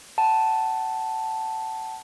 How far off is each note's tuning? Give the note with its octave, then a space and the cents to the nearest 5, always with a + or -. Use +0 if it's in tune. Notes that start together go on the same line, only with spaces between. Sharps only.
F#5 +30 A5 +0